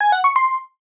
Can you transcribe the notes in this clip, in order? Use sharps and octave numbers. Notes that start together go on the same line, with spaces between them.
G#5
F#5
C#6
C6